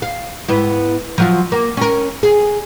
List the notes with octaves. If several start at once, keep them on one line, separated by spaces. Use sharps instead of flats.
F5
G#2 B3 E4
F3 F#3 F4
A#3
C#4 A#4
G#4